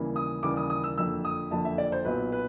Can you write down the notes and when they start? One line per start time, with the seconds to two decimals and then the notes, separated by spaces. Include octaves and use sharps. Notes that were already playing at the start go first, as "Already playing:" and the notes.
Already playing: D#2 C#3 E3 G3 A#3
0.16 D#6
0.43 D#2 C#3 E3 G3 A#3 D6
0.57 D#6
0.70 D#6
0.84 E6
0.98 F#1 F2 D3 E6
1.25 D#6
1.51 F#1 F2 D3 A5
1.65 E5
1.78 D5
1.92 C5
2.05 B1 A#2 F#3 B3 B4
2.32 B4